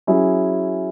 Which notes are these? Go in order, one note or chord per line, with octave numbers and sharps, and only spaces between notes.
F#3 C#4 E4 G#4